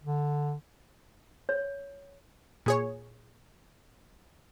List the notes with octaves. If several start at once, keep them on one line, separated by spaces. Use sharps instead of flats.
D3
C#5
A#2 G#4 C#5